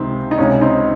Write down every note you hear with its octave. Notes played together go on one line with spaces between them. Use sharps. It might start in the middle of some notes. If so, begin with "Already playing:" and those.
Already playing: C#2 C3 D#3 C4 D#4
D#4
C#2 C3 D#3 C#4
C4 D#4